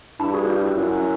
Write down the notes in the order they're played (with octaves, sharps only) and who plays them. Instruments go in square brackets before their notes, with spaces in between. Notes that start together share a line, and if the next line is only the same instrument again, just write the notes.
[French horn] G2 [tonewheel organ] D4 E4
[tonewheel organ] F#4 G#4
F4 G4
E4 F#4
[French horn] F#2